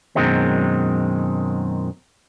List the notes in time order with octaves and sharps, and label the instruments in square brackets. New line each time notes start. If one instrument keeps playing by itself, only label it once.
[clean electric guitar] F#2 B2 D#3 F#3 G#3 C4